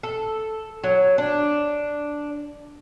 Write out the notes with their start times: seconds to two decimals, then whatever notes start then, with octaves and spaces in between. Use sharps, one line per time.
0.03 A4
0.84 F#3
1.18 D4